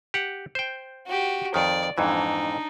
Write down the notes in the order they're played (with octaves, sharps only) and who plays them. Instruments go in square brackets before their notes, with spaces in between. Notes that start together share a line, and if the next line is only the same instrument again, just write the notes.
[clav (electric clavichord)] G4 F#5
C5 G5
[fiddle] F#4 G4
[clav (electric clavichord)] F2 D#3 [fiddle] D5
[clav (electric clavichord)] F2 G#2 E3 [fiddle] D4 D#4